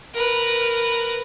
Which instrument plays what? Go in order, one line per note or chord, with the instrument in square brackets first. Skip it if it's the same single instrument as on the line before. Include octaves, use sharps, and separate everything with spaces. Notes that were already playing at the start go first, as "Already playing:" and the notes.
[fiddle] A#4 B4